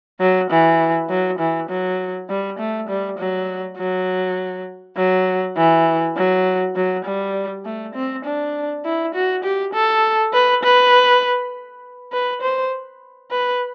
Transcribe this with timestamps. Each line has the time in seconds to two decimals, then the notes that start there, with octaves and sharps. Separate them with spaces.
0.20 F#3
0.50 E3
1.10 F#3
1.39 E3
1.69 F#3
2.29 G3
2.59 A3
2.88 G3
3.18 F#3
3.77 F#3
4.97 F#3
5.56 E3
6.16 F#3
6.76 F#3
7.05 G3
7.65 A3
7.95 C4
8.24 D4
8.84 E4
9.14 F#4
9.44 G4
9.73 A4
10.33 B4
10.63 B4
12.12 B4
12.42 C5
13.31 B4